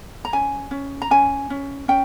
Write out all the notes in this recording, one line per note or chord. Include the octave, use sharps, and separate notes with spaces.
A#5
C#4 G#5
C#4
A#5
C#4 G#5
C#4
C#4 G5